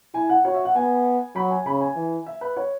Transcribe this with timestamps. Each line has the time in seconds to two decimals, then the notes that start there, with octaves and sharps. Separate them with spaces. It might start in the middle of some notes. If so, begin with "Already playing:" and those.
0.14 E4 G#5
0.29 F#5
0.45 F#4 C#5
0.54 E5
0.65 F#5
0.76 B3 G#5
1.35 F#3 B5
1.51 G#5
1.66 C#3 B5
1.81 G#5
1.96 E3
2.26 E5
2.41 B4
2.57 C#5